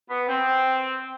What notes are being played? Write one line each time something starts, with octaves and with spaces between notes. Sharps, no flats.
B3
C4